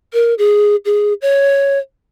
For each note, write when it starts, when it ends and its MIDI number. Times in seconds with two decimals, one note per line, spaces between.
0.13 0.34 70
0.38 0.76 68
0.85 1.13 68
1.22 1.79 73